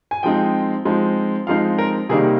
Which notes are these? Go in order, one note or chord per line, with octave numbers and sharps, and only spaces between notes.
G#5
F3 G#3 C4 D#4 G5
F3 G#3 C4 D#4
F3 G#3 C4 D#4 F5
A#4
C3 D#3 G3 A#3 D#4 G#4